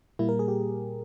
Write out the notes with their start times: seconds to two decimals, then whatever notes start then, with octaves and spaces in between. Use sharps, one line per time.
0.19 A#2 G3 A#3 E4
0.29 A#4
0.39 G#4
0.48 G4